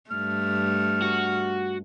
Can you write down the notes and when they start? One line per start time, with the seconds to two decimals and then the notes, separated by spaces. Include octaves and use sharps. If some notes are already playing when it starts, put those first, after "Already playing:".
0.11 G2 A3 F6
1.02 F#4